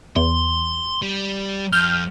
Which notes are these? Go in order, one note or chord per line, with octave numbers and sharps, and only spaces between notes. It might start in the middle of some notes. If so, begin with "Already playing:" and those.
E2 C6
G3
F2 F6 G6